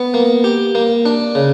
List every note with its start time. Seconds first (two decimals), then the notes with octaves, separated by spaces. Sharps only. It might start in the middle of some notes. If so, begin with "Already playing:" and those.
Already playing: B3
0.14 A#3
0.44 G4
0.75 A#3
1.06 D4
1.35 C#3